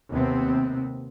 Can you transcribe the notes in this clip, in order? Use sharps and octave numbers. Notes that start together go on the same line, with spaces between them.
D#2 C3 B3 C4